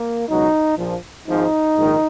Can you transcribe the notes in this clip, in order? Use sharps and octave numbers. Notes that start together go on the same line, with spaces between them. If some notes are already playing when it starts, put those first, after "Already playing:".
Already playing: A#3
C#2 B2 F#3 D#4
A#1 A#2 F3
G#1 G#2 F3 D#4
A#1 G#2 D#3